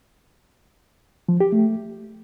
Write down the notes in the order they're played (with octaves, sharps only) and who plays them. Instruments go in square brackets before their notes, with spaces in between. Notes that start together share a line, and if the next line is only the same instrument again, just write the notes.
[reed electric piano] F3
G4
A3